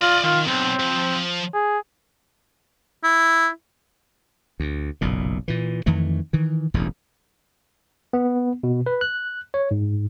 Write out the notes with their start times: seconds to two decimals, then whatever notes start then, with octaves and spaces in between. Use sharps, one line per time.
0.02 F4 D5 D#5
0.24 D#3 F4
0.48 B1 C4
0.80 F3
1.54 G#4
3.04 E4
4.60 D2
5.01 F#1 B1 A#2
5.48 A#2 E3
5.86 F2 D#3 E3 A3
6.33 D#3 E3
6.74 E1 A1 E2 G2
8.13 B3
8.63 B2
8.86 B4
9.01 F#6
9.54 C#5
9.71 G#2